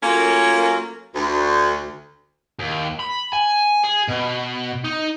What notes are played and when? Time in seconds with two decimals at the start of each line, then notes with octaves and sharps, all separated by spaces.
0.03 F#3 A3 A#3 C#4 F4 A#4
1.15 D2
2.59 D#2
2.99 B5
3.33 G#5
3.84 G#4
4.08 B2
4.84 D#4